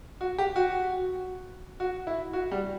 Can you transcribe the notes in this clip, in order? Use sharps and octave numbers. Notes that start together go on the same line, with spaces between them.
F#4
G4
F#4
F#4
E4
F#4
G3